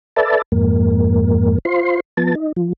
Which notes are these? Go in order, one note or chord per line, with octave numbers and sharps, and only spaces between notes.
A4 B4 D5 E5 A5
F2 G#2 A#3
F4 C5 C6
F3 B3 A5
D#4
F3